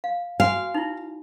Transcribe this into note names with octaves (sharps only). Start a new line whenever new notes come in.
F5
F#4 F5 G#5
D#4 E4